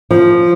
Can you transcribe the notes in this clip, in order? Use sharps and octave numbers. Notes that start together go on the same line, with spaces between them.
F3